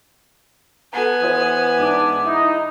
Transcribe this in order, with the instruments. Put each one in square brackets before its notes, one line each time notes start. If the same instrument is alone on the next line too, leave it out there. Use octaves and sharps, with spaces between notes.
[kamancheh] B3 G#5 [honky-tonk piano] A4 A#5
[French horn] E3 [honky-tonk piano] C5 D#6
[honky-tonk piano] G#2 [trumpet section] D4 D6
[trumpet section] D#4 [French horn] E4